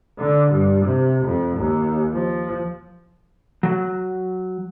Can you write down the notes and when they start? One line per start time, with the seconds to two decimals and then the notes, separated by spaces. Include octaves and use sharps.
0.18 D3
0.51 G2
0.85 C3
1.25 F2
1.57 D#2
2.13 F3
3.63 F#3